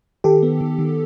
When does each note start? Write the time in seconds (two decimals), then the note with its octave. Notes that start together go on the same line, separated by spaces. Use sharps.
0.24 D#3 G4 A4
0.43 B3
0.61 D#3
0.79 D#3